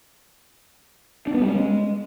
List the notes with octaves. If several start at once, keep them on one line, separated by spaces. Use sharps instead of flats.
D4
B3
G3
C#4
G#3